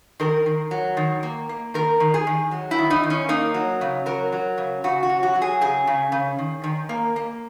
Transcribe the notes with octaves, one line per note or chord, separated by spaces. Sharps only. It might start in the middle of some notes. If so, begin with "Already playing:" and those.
D#3 A#4
D#3
F#3
D#3
A#3
A#3
D#3 A#4
D#3
G#4
D#3
F#3
E4
D#3
D#4
D#3
C#4
A#3 D#4
F#3
C#3
F#3 A#4
F#3
C#3
C#3 F#4
F#4
F#3
F#4
F#3
G#4
C#3 G#4
C#3
C#3
D#3
D#3
A#3
A#3